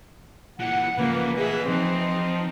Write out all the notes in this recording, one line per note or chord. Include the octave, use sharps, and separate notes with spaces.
A#2 E3 F#5
C#3 E3 F3 A#3 B4
G#4 D#5 E5 F#5
F3 C4 D#4